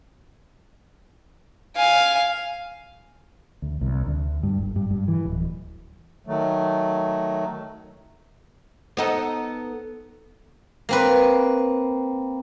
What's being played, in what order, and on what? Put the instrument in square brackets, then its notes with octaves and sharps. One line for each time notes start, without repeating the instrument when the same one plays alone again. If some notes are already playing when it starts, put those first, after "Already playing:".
[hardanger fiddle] F5 G#5
[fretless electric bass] D2
C2
D2
G2
G1
G2
G2
E3
D1
[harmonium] D#3 F#3 A3
[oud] B3 D#4 A4
[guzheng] A#3 C4 B4